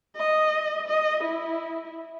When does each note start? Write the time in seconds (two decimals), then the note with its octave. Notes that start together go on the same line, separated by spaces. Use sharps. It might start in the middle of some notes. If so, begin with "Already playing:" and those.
0.16 D#5
0.88 D#5
1.24 E4